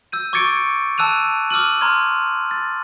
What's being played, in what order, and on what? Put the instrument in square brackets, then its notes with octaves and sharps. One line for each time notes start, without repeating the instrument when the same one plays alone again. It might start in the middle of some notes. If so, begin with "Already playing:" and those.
[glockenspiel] E6 G6 D#7
C#6 D6 G#6 A6 C#7 D7
A5 E6 F#6 D#7 F7
D6 E6 F6 D#7 F#7
A#5 C6 F6 G#6
A6